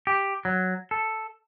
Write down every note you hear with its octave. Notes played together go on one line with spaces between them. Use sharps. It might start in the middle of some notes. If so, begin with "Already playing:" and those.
G4
F#3
A4